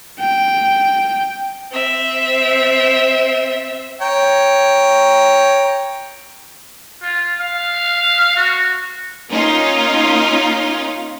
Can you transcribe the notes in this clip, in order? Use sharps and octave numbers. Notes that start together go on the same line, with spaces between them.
G5
C4 E5
C#5 G5 A#5
F4
F5
F#4
A#3 C#4 D#4 F4